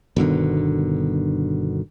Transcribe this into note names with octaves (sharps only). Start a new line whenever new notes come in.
G1 B2 D3 D#3